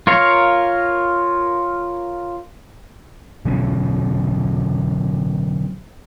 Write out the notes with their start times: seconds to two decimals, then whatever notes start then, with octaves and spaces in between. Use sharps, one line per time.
0.07 F4 A#4 C#5 F5
3.45 B2 D3 F#3 C#4